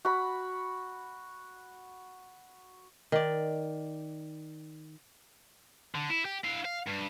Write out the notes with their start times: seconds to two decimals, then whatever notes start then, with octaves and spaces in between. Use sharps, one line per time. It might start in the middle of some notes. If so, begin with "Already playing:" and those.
0.05 F#4 B5
3.12 D#3 D5
5.95 D3
6.10 E4
6.25 G4
6.44 E4 F5
6.65 F5
6.87 G2